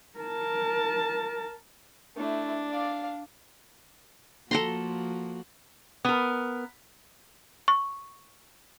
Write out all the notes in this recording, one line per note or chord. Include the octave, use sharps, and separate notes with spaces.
A#4 A5
A3 D4 E4
D5 F5
F3 A#3 F#4 A4 A#5 C6
B3 A#4
C#6